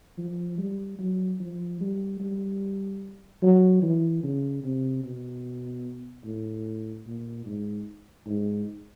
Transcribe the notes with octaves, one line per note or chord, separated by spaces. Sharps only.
F3
G3
F#3
F3
G3
G3
F#3
E3
C#3
C3
B2
A2
A#2
G#2
G#2